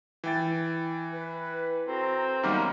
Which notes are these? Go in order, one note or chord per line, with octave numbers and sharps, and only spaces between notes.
E3 G5 A6
B4
C4 F#4 A4 A#5
F#2 D#3 G3 A#3 B3 D#4